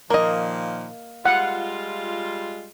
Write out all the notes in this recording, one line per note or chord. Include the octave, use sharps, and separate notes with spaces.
A#2 D#3 F3 A#3 D#5
G3 G#3 F4 F#5